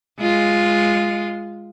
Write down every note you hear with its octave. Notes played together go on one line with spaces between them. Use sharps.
G#3 F4